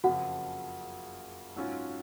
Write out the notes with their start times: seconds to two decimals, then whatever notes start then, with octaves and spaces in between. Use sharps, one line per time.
0.04 F#1 F2 C#3 F3 F#4 F#5
1.56 G#2 F#3 C#4 F4